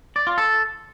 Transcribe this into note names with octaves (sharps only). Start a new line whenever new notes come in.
D5
F4
A4